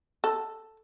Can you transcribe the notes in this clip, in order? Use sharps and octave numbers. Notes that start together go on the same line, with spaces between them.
A4